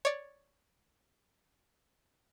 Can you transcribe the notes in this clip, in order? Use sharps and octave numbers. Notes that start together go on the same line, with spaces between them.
C#5 D5